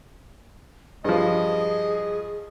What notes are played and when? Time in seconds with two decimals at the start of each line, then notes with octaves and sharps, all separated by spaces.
1.05 G2 F3 G#4 D#5